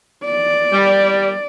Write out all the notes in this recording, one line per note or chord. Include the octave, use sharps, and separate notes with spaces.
D5
G3